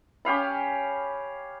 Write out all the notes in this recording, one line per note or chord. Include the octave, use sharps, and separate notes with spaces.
C#4 G4 F5 B5